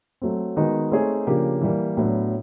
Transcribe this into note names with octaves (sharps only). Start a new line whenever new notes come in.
F#3 A3 C4
D#3 G#3 B3 D#4 F#4
A3 C4 D#4 G#4 C#5
C#3 F3 A#3 D4 G4
E3 G3 A#3
A2 F#3 B3 D4